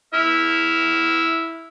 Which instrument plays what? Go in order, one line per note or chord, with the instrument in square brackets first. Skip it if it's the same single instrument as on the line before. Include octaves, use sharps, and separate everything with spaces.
[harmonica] E4 E5 F6